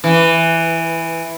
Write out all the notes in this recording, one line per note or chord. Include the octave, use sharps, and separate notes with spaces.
E3